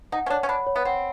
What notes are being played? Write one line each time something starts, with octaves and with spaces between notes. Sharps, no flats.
D#4 F#5
C#4
D4 C#5
C#4
D4 B5
C#5
B3
C4 F#5